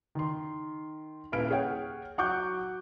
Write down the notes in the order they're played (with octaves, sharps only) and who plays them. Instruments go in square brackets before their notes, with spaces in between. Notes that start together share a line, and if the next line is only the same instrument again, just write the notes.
[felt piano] D#3 C6
D#1 E4 B4 F5 F6 D7
G#4 C#5 F#5 G5
F#3 F#5 C#6 D6 F#6 G6